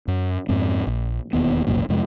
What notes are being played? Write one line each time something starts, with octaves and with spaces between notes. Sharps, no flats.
F#2
F2 G#2 C4
A#1
E1 D#2 B3
F#1 C2 F#2 A#2
F2 C3 G#3